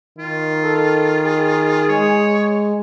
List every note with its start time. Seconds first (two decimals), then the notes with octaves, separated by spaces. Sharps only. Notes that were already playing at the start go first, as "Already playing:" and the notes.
0.18 D#3 F4
0.64 A4
1.25 G#4
1.88 G#3 C#5